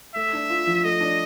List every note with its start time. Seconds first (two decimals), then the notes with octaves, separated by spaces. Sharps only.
0.15 A3 E5
0.33 D4
0.50 F4
0.67 F3
0.84 A3 D#5
1.01 D4